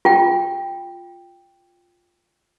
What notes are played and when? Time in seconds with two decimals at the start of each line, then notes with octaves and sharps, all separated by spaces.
0.05 F4 G5